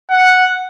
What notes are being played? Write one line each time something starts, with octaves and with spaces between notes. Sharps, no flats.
F#5